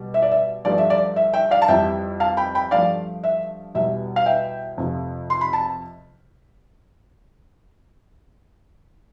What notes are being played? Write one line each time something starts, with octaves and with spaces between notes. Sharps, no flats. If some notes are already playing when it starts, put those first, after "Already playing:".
Already playing: B2 G3
E5
D5
E5
G2 F3 A3 D5
E5
D5
E5
E5 G5
D5 F5
A5
F2 E3 G3 E5 G5
F5 A5
G5 B5
G5 B5
G2 F3 A3 D5 F5
E5
E2 B2 G3 E5
F5
E5 G5
F2 C3 F3 A3
C6
B5
A5